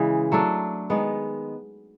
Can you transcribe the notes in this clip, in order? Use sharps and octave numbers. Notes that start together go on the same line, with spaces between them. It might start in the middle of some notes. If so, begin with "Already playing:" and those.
Already playing: C#3 E3 G#3
F#3 A3 D4
D#3 G#3 B3